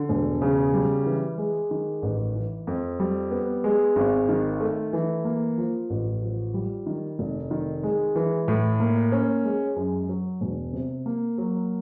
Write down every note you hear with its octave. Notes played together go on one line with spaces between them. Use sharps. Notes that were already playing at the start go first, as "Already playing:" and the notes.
Already playing: D3
E1
C#3
G3
E3
G#3
D#3
A1
E3
F2
G3
B3
G#3
G#1
D#3
A3
E3
A#3
F3
A1
F3
G3
D#3
F1
D#3
G#3
E3
A2
A#3
C#4
G#3
F#2
F#3
E1
C3
A#3
F#3